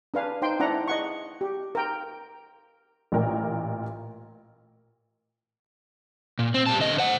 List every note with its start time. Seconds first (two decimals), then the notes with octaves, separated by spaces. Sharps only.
0.14 D4 B4 F5 G#5
0.42 D#4 C5 G5 C6
0.60 D4 E4 F#5 A#5
0.88 D#5 F#5 C#6
1.41 G4
1.75 A#4 G5
3.12 A1 A#2 A#4 G5
6.39 A#2
6.54 C4
6.66 G3 A5
6.80 D3 D#5
6.98 C5 F#5